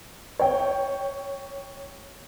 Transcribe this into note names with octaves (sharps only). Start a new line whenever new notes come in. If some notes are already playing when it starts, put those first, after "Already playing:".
C#5 G5